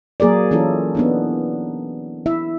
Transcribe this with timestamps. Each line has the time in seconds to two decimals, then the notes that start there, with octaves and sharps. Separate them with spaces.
0.20 F#3 A#3 G#4 A#4 D5
0.51 E3 C#4 E4 F4 A4
0.95 B3 D4 D#4
2.26 E4 E5